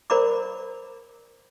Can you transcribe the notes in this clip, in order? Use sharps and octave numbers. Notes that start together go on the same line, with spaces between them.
A#4 C5 D5 A#5 B5 D6